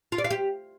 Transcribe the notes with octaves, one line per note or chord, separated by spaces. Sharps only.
F4
D5
F5
G4